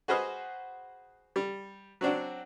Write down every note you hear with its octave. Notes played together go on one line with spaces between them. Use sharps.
F#4 G#4 B4 C5 D#5 F6
G3
F#3 C4 D4 F#4